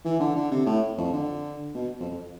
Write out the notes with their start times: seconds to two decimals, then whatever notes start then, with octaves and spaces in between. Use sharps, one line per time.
0.05 E3
0.20 D3
0.36 D3
0.51 C3
0.66 A2
0.98 F2
1.13 D3
1.75 B2
2.00 F2
2.10 F2